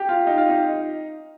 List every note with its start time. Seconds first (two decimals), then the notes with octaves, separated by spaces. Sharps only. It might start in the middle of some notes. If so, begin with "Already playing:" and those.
Already playing: G4
0.09 F4
0.27 D#4
0.38 F4
0.49 D#4